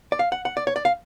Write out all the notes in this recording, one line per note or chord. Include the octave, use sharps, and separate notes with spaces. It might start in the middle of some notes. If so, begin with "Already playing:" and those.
D5
F5
F#5
F#5
D5
C#5
D5
F5